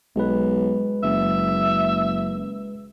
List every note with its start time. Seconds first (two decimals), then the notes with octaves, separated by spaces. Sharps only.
0.16 B1 G#3 B4
1.03 F#1 E5